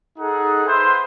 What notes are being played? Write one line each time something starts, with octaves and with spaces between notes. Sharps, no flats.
D#4 G#4 A4 F#5
B4 C5 E5 C6